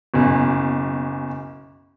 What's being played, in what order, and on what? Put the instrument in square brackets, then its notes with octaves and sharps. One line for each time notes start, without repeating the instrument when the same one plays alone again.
[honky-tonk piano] F#1 B1